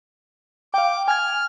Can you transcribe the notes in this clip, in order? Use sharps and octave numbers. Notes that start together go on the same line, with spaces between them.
F5 G5 D6
G#5 F6 G#6